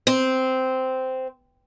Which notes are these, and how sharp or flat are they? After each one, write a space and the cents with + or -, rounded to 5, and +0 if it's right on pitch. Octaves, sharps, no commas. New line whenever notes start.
C4 -10